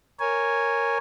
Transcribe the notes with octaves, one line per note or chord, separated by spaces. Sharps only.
A#4 C#5 G#5